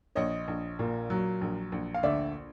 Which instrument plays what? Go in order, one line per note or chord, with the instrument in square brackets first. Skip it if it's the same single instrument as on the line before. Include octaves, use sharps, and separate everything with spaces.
[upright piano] A#1 C#5 D#5
A#1
A#2
F#3
A#1
A#1
F5
D2 D5 E5